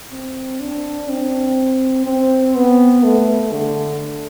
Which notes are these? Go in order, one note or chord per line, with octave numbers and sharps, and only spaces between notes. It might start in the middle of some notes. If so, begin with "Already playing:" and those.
C4
D4
C4
C4
B3
A3
D3